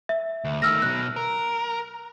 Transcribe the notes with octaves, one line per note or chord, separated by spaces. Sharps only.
E5
D2
D#3 A3 E6 F6 A#6
B2 F#3 F#6
A#4